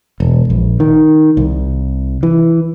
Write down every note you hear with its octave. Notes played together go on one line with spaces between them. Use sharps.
E1
A#1
D#3
C2
E3